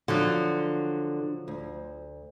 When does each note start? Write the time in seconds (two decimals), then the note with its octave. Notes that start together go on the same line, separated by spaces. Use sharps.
0.08 D3 F3 F#3 F#4
1.48 D2